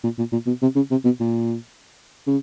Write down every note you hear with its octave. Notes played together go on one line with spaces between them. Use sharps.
A#2
A#2
A#2
B2
C3
C#3
C3
B2
A#2
C#3